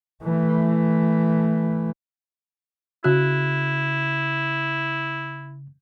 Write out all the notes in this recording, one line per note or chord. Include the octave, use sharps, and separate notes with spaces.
E3 A3
C#3 E4 F#4 F#6